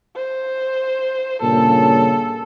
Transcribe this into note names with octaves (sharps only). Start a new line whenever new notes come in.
C5
G2 A#2 C#3 A4